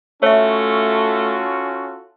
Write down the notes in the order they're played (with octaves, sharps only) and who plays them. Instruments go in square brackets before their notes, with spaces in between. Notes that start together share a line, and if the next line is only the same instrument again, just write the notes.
[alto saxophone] A3 [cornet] C#4 [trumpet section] F4 F#4 A4 [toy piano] C#5 E5